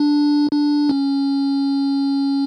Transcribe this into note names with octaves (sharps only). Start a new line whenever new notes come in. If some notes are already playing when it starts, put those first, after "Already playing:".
Already playing: D4
D4
C#4